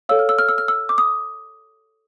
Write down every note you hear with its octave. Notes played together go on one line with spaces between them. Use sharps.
A4 C#5 F5 E6
F6
E6
F6
E6
F6
E6
D6
D#6